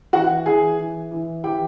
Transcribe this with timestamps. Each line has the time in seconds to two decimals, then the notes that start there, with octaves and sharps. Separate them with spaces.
0.13 E3 F#4 F#5
0.46 E3 G#4 G#5
0.79 E3
1.11 E3
1.44 E3 G4 G5